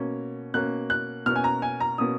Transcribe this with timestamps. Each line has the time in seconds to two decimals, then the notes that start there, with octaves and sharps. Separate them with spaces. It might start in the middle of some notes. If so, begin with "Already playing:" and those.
Already playing: B2 A#3 C#4
0.54 B2 A#3 C#4 F#6
0.90 F#6
1.26 B2 A#3 C#4 F6
1.36 G#5
1.44 A#5
1.62 G#5
1.80 A#5
1.98 B2 A#3 C#4 D#6